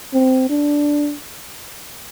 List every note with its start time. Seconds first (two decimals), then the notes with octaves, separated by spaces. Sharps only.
0.13 C4
0.50 D4